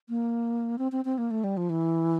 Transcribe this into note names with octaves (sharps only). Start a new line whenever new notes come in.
A#3
C4
C4
C4
A#3
A3
G3
F3
E3